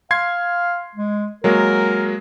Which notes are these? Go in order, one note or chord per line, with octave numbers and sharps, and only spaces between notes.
F5 C6 G#6 C7
G#3
F#3 G#3 A#3 A#4